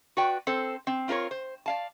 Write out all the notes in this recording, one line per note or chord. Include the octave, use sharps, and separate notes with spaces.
F#4 B4 D5 G5
C4 A4 C5
C4
C4 F4 A#4 B4 C#5
C5
D5 F5 A5